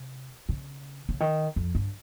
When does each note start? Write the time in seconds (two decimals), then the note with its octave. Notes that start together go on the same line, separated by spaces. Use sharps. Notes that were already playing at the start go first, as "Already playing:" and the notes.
Already playing: C3
0.49 C#3
1.09 C#3
1.20 D#3
1.56 F2
1.75 G2